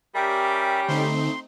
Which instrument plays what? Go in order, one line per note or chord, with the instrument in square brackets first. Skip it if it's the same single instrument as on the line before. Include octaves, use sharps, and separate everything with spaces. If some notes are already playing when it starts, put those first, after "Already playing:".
[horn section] G3 C#4 G4 [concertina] A#4 D5 E5 [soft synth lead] G5
[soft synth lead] D3 [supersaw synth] A3 C4 D#4 [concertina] C6